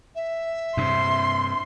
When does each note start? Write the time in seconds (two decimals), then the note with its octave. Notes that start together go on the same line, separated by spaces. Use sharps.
0.15 E5
0.77 G2 C3 C6